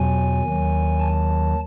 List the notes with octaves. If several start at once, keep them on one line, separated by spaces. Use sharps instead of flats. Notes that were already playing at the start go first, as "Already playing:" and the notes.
Already playing: E2 B2 F#3 G#5
D#2 D#3 F#3
A5